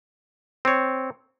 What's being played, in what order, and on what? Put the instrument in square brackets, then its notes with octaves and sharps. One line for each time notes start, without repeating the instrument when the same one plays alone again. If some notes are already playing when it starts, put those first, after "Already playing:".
[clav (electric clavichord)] C4 C#5